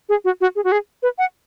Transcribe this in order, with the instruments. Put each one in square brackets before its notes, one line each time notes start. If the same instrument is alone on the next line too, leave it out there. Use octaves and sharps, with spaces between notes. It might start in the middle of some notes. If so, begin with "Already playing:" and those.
[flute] G#4
F#4
F#4
G#4
F#4
G#4
B4
F#5